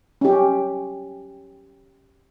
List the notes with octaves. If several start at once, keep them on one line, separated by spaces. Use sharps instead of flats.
C#4 G4